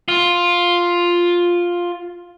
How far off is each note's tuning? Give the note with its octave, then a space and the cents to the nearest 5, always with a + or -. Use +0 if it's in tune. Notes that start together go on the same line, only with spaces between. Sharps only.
F4 +5